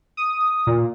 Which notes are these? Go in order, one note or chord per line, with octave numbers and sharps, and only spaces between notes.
D#6
A#2